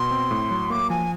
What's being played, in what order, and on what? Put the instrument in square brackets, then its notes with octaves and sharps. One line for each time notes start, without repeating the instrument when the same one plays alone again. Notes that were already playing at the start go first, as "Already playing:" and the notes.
Already playing: [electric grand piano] B2 [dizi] C6
[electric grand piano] C4
A2
F#3
[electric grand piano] A#3 [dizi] D6
[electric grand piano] F3 [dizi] G#5